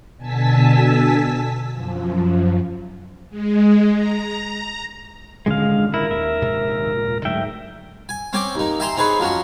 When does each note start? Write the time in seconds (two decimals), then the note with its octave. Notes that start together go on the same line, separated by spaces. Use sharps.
0.16 B2 D3 G#5 A5 E6 B6
1.71 F#2 F3
3.30 G#3
3.94 A#5
5.46 D#1 G#1 D3 G#3 C#4 F5
5.94 E4 A#4
6.11 D#2 E5
6.42 A#1 G#2 C3
6.96 A#2
7.25 G#2 D3 F#3 A3 E5 G5
8.09 G#5
8.33 C4 C#4 G5 G#5 D6
8.55 D#2 D#4
8.80 E5 G5 G#5 A#5 C6
8.97 C4 D#4 G#4 B4 C#5
9.20 F3 F#3 C#4 F#4